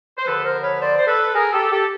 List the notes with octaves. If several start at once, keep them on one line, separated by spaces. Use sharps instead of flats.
C5
D#2 D3 F3 A4 B4
A#4 C5
B4 C#5
C5 D5
C5
A4 B4
G#4 A#4
G4 A4
G4 A4